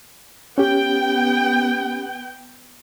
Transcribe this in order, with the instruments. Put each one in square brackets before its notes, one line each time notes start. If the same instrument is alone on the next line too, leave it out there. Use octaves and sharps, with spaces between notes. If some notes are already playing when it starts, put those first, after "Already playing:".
[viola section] B3 G5 [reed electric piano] C#4 G4